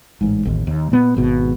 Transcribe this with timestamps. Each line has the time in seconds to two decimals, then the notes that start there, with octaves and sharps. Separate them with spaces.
0.21 A1 G#2
0.45 A1 D#2
0.67 D#2
0.92 A#2 B3
1.16 G#1 B2